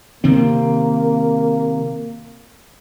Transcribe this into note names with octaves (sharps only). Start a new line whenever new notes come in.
C3 D#3 A#3 C4